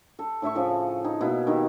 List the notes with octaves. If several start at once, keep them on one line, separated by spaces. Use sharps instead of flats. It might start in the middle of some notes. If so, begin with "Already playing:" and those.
A4
A2 E4 E5 C#6
A2 C#3 F3
D#4 G#5
B2 A#3 E4
D#3 D#4 G4